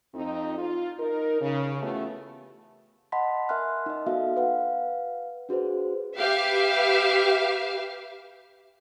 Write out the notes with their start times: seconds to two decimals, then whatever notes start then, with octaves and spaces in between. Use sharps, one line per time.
0.15 F2 C4 D#4
0.58 F4
1.00 D#4 A#4
1.41 C#3
1.81 E3 A3 B3 C#4 F4 G4
3.12 D#5 F#5 A5 B5 C6 B6
3.49 A#4 E5 G#5 C6 F6 F#6
3.86 D#4 D#5
4.06 B3 F#4 A4 E5 F5
4.36 B4 F5 F#5
5.49 D4 F#4 G#4 B4 C5
6.17 G4 B4 E5 F5